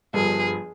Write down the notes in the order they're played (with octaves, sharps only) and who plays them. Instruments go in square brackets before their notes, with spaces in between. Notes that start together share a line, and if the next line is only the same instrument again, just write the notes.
[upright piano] G1 G2 F3 [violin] G#4